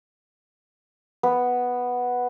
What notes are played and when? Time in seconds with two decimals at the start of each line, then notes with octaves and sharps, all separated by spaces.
1.23 B3